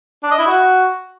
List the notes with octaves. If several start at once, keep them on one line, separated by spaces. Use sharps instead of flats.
D4
D#5
E4
F#4